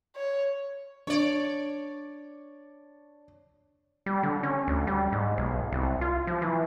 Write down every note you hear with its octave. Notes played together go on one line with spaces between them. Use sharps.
C#5
D4 C#5 D5
G3
D3
C#4
D2
G3
G#2
B1
C2
F4
F3
E3